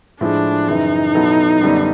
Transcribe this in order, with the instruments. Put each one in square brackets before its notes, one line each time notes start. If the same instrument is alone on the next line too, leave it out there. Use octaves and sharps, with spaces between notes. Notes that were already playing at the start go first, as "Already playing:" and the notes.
[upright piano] A2 F3 G#3 [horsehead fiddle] D4
[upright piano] F#2 C#3 E3 [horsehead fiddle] D#4
[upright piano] B2 F#3 B3 E4 A4
F#2 D3 G3 B3 D4